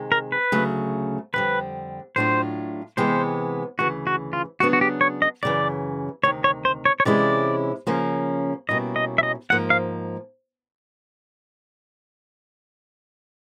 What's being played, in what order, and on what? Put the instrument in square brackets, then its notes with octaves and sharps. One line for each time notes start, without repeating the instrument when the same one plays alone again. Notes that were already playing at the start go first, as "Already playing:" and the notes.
Already playing: [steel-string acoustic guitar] C3 D#3 G#3
[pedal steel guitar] A#4
B4
[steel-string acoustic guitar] D2 C#3 F#3 A3
[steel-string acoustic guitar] F2 D3 G3 [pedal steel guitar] B4
[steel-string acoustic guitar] A2 F#3 A3 D4 F4 [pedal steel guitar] C5
[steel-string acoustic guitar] C3 E3 G#3 B3 [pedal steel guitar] C5
[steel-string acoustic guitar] D2 C#3 E3 [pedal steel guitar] F#4
[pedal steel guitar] F#4
F4
[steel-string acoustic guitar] C#3 F#3 B3 D4 [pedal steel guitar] F#4
[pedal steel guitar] F#4
G4
C#5
D#5
[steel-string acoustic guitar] F#2 C#3 E3 [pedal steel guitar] D5
[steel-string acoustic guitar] D2 C3 D#3 [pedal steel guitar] C#5
[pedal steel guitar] C#5
C5
C#5
C#5
[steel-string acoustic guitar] C3 E3 G#3 C#4 E4 [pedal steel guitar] D5
[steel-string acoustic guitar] C#3 F3 A#3 C#4
[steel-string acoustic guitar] B2 G3 A#3 C#4 E4 [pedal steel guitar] D#5
[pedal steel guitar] D#5
E5
D#5
[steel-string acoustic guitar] G#2 F3 A#3 [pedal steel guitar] F#5
[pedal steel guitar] F5